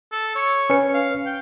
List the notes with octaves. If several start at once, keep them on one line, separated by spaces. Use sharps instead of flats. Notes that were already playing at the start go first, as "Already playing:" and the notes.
A4
C#5
C#4 B4 C#7
F5
G5